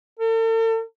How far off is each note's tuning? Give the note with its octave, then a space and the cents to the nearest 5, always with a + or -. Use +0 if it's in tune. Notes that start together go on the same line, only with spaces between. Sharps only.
A4 +45